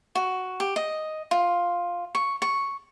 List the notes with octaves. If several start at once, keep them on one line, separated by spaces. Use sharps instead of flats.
F#4
G4
D#5
F4
C#6
C#6